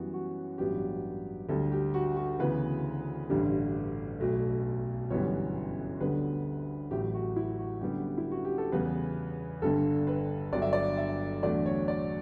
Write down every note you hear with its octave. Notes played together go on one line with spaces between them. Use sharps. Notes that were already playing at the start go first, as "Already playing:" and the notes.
Already playing: F#2 E3 G3 B3 F#4
F#4
A1 G2 F#3 B3 G4
D2 D3 G3 A4
G4
F#4
F#4
D2 C#3 E3 B3 B4
A1 G2 D3 G3
B1 B2 A3
G1 F#2 E3 G3 B3 C#5
D2 D3 G3 B3 B4
A1 A2 F#3 A3 G4
F#4
E4
F#4
F#2 D3 G3 B3 G4
E4
F#4
G4
A4
E2 C#3 G3 B3 B4
G1 G2 D3 A4
B4
G1 G2 F#3 D5
E5
D5
E5
E2 D3 F#3 A3 D5
C#5
D5